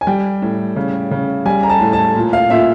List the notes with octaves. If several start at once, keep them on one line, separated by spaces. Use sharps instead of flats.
G#5
G3 G5
A2
C#3
C#3
G3 G#5
A#5
A5
A2
A5
A#2
F5
A#2 E5